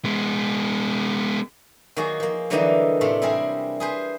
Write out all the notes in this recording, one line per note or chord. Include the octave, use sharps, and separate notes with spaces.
G#3 B3
D#3 F#3 A#3 F#4 G#4
F3 A#3
D3 E3 F#3 G3 A#3 D#4
A2 C3 A3 D4 F4
G3 C4 E4 G#4 A#4
G#4 B4 C5